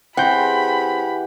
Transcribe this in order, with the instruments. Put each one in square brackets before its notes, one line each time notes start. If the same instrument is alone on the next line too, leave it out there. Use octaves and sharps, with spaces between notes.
[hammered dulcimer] E3 G4 G#4 [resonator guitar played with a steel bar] C4 [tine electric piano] F#5 G6 [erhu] B5